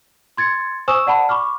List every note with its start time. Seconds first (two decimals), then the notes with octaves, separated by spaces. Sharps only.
0.37 C6 G#6 A6 C#7
0.88 C5 G#5 C#6 D#6 E6 E7
1.07 D5 F#5 A5 B5
1.29 B5 C#6 D6 F6